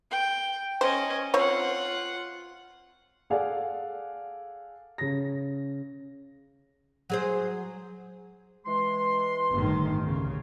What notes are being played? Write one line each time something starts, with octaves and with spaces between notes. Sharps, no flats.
G5
C#4 C5 D#5
C4 F4 C#5 F#5
G#4 A4 D5 F5 F#5 G#5
C#3 A#6
F#3 G#4 C5
E3 G#3 C6
G1 A2 D#3
C2 C#3